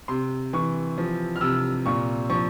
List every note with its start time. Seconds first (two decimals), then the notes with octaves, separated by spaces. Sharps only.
0.08 C3 C6
0.53 E3 C#6
0.98 F3
1.36 F6
1.41 C3 E6
1.86 A#2 C#6
2.30 F3 C#6